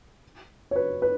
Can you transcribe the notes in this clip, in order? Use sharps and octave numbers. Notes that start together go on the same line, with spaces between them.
C#5
B4
B4